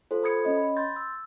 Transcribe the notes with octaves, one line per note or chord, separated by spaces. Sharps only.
F4 A4 C5
A4 B5 D#6 G#6 C#7
C#4 D#5
B5
C6 G6 A6
E6